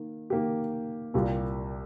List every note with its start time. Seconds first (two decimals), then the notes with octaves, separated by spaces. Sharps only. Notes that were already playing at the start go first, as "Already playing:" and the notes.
Already playing: D#3 A#3
0.30 D#3 A#3 G4
1.14 C2 A#2 A#3 G4